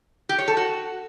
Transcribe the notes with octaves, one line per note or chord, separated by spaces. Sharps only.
G4
C#5
A4
F#4